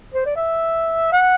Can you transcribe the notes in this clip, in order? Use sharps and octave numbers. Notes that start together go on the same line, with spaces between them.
C5
D5
E5
F#5